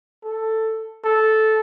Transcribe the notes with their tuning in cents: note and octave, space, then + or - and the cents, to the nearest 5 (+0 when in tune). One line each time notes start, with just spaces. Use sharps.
A4 +10
A4 -10